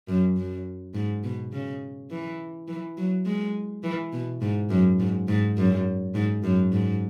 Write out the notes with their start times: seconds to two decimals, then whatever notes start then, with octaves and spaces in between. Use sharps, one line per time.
0.08 F#2
0.37 F#2
0.95 G#2
1.24 B2
1.53 C#3
2.10 E3
2.68 E3
2.97 F#3
3.26 G#3
3.83 E3
4.13 B2
4.42 G#2
4.70 F#2
5.00 G#2
5.28 G#2
5.57 F#2
6.15 G#2
6.44 F#2
6.72 G#2